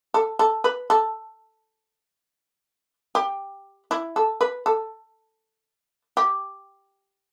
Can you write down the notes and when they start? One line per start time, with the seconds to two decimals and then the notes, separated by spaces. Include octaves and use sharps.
0.14 A4
0.39 A4
0.64 B4
0.90 A4
3.15 G4
3.91 E4
4.16 A4
4.41 B4
4.66 A4
6.17 G4